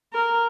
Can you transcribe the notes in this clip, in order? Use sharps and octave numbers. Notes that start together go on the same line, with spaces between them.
A#4